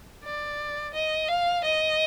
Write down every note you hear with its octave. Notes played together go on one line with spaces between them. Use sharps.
D5
D#5
F5
D#5